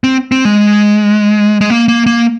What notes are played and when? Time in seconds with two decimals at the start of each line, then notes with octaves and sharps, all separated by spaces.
0.04 C4
0.32 C4
0.45 G#3
1.61 G#3
1.70 A#3
1.88 A#3
2.06 A#3